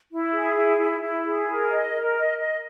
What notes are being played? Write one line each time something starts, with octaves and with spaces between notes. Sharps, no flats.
E4
G#4
E4
E4
E4
G#4
A#4
D#5
A#4
D#5
D#5